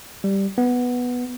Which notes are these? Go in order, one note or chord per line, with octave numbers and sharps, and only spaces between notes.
G3
B3